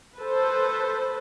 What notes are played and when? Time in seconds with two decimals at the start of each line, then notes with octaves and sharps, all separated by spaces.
0.20 A4 B4 C5